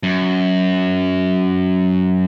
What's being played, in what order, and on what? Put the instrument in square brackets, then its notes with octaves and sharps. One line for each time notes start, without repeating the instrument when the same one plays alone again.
[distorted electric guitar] F#2